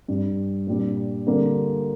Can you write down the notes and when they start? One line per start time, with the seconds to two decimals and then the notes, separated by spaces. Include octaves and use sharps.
0.08 G2 G3 D4
0.67 A#2 G3 D4
1.27 D3 G3 A#3